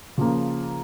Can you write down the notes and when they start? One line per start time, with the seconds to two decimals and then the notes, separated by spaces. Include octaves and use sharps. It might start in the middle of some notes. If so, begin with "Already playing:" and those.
0.18 C#3 F3 A#3